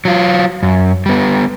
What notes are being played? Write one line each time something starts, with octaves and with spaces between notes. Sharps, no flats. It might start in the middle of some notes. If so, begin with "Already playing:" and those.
F#3 F4
F#2
G3 B3